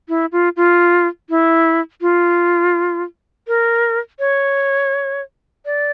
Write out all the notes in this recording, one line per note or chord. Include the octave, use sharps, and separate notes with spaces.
E4
F4
F4
E4
F4
A#4
C#5
D5